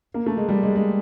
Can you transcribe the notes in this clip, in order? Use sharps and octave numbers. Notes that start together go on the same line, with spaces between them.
A#3
A3
G#3
G3
G#3
G#3